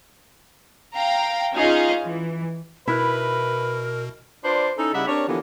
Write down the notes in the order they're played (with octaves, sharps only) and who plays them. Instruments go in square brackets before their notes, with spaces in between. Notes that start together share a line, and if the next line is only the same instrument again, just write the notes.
[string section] F5 G5 A#5
C#4 D#4 F4 G#4 D#5 F5
E3
[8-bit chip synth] B2 [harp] E4 F#6 [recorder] A#4 [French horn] B4
[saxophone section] D4 F4 B4 C5 D5
C#4 D#4 E4 A4
C#3 G3 D#4 E4 E5 F#5
C4 D4 G4 A#4 C#5
D3 E3 F3 A#3 B3 G4